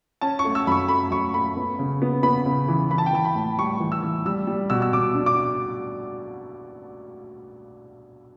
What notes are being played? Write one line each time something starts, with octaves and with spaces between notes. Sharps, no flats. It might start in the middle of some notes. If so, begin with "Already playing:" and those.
C#4 A5
C#6
A3
E6
F#2 B5 C#6
A3 B5
F#2 C#6
A3 B5
B3
C#3
B3
B3 B5
C#3
E3
E3 B5
A5
G5
E3 A5
B5
A2
G3 C#6
E3
E6
E3
G3 E6
G3
B2 E6
E6
B2 D6
D4
D6